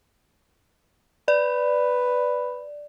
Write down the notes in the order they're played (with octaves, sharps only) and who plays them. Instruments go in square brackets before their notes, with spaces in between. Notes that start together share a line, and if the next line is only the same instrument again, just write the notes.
[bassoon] B4 [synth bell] D5